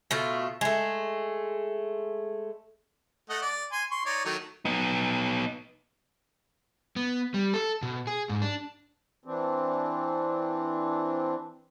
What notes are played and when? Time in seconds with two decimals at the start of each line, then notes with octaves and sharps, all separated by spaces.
0.11 B2 A3 F4
0.61 G#3 A3
3.29 A3 D#5 F#5
3.42 D5
3.72 G#5 C6
3.91 C6 C#6
4.05 D#4 C#5 D5
4.25 D#3 F#3 A3
4.65 B3 D#4
6.96 B3
7.34 G3
7.54 A4
7.82 B2
8.07 G#4
8.29 G#2
8.42 D4
9.25 E3 C4 D4